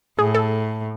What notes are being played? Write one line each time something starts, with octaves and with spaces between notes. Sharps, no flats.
A2 G#4
A4